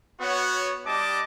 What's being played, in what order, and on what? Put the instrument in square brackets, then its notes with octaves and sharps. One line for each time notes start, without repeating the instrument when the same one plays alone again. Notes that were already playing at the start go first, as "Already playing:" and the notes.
[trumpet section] B3 F#4 C#5
G3 D4 D#5 A5 D6